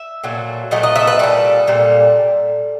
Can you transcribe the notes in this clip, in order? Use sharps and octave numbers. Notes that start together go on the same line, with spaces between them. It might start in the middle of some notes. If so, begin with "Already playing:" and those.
Already playing: E5
A#2 F#3 A3
A#2 F#3 A3 D#5
D#5
E5
B4
A#2 G3 A4
A#2 G3